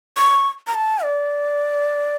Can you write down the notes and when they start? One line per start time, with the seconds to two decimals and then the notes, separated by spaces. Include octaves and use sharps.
0.17 C#6
0.67 A#5
0.75 A5
1.03 D5